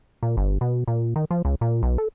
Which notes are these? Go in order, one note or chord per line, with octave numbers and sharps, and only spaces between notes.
A#2
G1
B2
A#2
D#3
F3
C#2
A#2
B1
A4